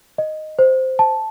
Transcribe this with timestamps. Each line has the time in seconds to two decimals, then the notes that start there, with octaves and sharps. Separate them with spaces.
0.18 D#5
0.59 C5
0.99 A5